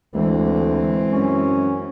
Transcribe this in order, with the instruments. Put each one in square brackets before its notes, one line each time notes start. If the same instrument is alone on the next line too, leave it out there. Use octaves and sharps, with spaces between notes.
[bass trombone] D2 [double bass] E3 C4 [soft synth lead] G#3
[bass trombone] F#2 [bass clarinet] C#4